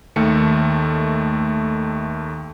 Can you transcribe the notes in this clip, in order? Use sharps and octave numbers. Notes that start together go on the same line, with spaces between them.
D#2 D#3 A3 C#7